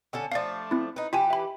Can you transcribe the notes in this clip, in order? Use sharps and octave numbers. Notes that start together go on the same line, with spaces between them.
D3 C#4 A4
F3 A3 D4 D5 F5
C4 E4
D#4 B4
E3 F4 G4 B4 G#5
E5 B5